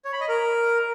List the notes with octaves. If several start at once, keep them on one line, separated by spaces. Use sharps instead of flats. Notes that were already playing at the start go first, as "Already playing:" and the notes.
C#5
B5
D#5
A#4